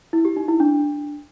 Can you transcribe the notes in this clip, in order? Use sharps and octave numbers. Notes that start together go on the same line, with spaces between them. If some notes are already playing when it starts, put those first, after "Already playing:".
E4
G4
D#4
E4
D4